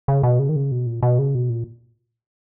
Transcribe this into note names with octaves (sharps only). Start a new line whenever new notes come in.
C#3
B2
C#3
D#3
C#3
B2
A#2
B2
C#3
B2
A#2